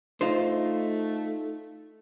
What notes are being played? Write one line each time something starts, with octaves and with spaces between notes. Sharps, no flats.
A3 D#4 F4 C5